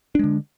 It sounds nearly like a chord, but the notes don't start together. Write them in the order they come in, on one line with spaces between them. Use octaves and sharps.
D4 G#3 D3